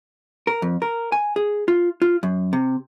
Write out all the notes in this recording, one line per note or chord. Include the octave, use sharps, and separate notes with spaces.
A#4
F2
A#4
G#5
G#4
F4
F4
F#2
C3